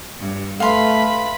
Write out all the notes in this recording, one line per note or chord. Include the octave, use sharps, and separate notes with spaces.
G2
A3 B4 F5 B5 C6